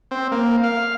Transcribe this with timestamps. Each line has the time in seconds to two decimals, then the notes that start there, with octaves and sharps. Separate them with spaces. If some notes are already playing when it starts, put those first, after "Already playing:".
0.11 C4
0.32 A#3
0.63 F5